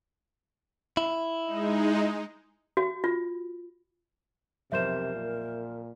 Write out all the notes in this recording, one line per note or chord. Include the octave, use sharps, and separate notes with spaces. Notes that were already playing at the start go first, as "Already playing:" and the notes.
E4
G#3 D#4
F#4
F4
B1 F2 C3 A#4 C5 E5 G6 E7
A#2